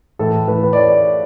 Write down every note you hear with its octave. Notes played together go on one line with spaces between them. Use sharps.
A2 E3 A3 A4
A2 E3 A3 B4
B4
D5
C#5